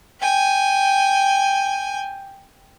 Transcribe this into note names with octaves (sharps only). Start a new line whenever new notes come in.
G5 G#5